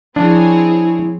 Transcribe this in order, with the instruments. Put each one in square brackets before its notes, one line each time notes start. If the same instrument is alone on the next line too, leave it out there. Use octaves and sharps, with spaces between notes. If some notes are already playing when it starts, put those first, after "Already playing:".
[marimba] F3 [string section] C4 G#4 C#5 [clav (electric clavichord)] D4 [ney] E4